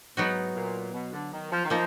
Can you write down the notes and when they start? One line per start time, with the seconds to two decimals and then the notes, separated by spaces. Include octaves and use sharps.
0.17 G#2 F#3 B3 D#4 F#4
0.55 A#2
0.93 B2
1.13 D3
1.32 D#3
1.51 F3
1.65 D#3
1.70 F3 A#3 D#4